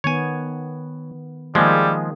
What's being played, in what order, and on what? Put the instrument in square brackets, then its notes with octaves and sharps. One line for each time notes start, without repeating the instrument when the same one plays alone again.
[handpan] D#3 B3 [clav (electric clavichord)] C#5 G#5
[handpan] D#3 A#3 G#4 [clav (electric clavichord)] F3 G#3 [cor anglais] G3